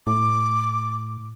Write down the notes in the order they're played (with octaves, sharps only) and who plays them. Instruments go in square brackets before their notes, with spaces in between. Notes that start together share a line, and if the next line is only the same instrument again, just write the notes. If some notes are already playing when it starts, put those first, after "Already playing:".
[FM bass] A2 [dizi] D6